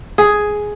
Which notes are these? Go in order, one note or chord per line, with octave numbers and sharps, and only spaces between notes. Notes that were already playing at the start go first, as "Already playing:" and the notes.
G#4